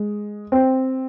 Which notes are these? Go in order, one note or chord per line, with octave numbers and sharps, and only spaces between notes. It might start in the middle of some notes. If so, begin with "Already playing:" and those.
Already playing: G#3
C4